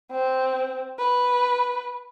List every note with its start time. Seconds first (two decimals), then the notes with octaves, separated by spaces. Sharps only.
0.11 C4
0.98 B4